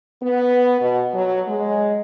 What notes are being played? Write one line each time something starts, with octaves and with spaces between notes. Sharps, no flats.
B3
B2
F#3
G#3